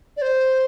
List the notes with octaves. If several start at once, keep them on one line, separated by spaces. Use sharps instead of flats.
D5
C5